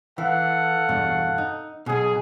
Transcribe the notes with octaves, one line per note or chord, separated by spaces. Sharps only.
E3 A4 F5 F#5
E2 G2 B2
D#4
B1 B2 G#4